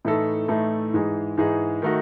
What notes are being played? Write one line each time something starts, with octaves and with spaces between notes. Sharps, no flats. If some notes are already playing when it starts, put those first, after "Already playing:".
A2 E3 A3 D#4 A4
A2 E3 A3 D#4 A4
G#2 E3 G#3 D#4 G#4
G#2 E3 G#3 D#4 G#4
D#3 A3 D#4 F#4